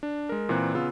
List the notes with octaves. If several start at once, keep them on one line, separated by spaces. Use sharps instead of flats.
D4
G#3 A#4
A#2 E3 C4 A#5 F#6
C#3 B3 F4 E6